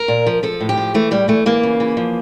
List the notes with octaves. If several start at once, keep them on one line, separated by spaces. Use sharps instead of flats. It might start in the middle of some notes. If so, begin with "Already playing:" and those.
Already playing: A#4
A#2
F3
F3 A4
A2
G4
F3
E3 A3
A2 G3
E3 A3
E3 A#3
C#3
E3
F3